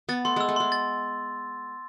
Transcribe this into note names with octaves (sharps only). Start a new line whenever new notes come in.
B3 A6
A3 C6
G#3 E6
A3
G#3 C6
A6